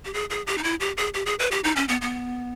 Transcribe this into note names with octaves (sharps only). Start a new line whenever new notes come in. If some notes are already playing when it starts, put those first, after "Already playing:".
G4
G#4
G#4
G4
D#4
E4
G4
G#4
G4
G#4
B4
G4
D#4
C#4
B3
B3